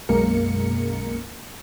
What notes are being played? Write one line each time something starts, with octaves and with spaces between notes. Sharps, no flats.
B1 F#2 G#3 A#3 A#4 C#7